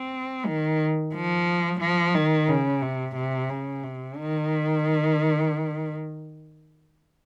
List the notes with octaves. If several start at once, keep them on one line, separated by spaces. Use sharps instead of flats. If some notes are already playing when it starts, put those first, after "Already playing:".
Already playing: C4
D#3
F3
F3
D#3
C#3
C3
C3
C#3
C3
D#3